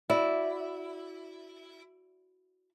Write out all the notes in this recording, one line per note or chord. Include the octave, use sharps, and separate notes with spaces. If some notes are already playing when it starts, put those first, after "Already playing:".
E4 F#4 D5